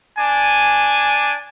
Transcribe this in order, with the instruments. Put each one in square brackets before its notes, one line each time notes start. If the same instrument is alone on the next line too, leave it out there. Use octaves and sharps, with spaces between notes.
[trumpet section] D4 G#5